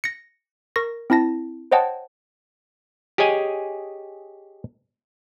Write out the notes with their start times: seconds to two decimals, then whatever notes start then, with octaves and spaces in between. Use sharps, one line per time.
0.04 A#6 C#7
0.76 A#4 C#6 A#6
1.10 C4 E4 A5 A#6
1.72 C5 C#5 D#5 F#5 G5 A5
3.18 G4 G#4 C#5 D#5 G#5